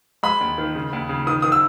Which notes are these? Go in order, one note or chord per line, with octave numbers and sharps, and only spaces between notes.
G#3 B5
D#2
D#3
C#3
D#2
C#3
D#3 D#6
D#3 D#6
E6